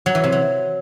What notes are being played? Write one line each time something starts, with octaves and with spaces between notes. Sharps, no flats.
F#3
E3
C3
F#3